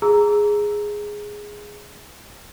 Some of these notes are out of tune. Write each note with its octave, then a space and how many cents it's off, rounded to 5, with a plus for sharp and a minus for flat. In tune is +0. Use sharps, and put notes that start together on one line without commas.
G#4 +0 A#5 -5 E6 +0